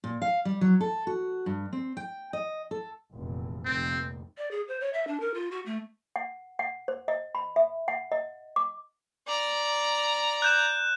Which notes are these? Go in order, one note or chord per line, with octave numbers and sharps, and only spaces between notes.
A#2
F5
G3
F#3
A4
F#4
G2
C4
G5
D#5
A4
F1 E2 A#2
F1 D#2 C4
D5
G#4
C5
C#5
E5
D4
A#4
F4
F#4
A3
F#5
F#5
C5
D#5
B5
E5
F#5
D#5
D6
D5 A#5
F#6 G6 E7